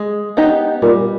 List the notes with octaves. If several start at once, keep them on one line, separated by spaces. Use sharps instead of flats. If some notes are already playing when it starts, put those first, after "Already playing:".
Already playing: G#3
B3 D#4 G4
A#2 G3